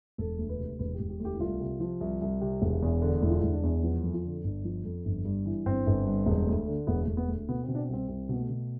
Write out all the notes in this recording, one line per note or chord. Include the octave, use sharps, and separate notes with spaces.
E1 A4
D2
B4
C3
E1 B4
G4
E1
G4
D2
G4
E4
C2 F4
C3
F3
C2
C2
C3
E1
E2
D3
E1 E4
F4
E1 E4
D4
E2
F3 B3
F2
F4
D3
G1 D4
F3
F2
G1
G2
E3
G1 C4
G1
G2
E1
D2
D3
E1 B3
E1 A3
B3
D2
B2 B3
B2 C4
D4
C4
C2 C4
C2 C4
B2 B3
A3
B2